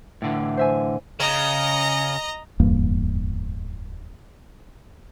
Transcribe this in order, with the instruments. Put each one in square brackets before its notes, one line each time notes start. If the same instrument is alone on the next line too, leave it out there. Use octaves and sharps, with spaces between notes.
[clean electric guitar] A2 D3 E3
[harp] C5 E5 G#5
[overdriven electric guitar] C#3 [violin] D#5 A#5
[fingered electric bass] D1 E2 G2 A#3